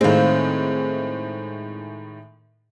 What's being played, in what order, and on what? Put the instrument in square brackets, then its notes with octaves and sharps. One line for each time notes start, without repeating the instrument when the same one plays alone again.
[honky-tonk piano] A2 D#3 G#3 [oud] C4 F5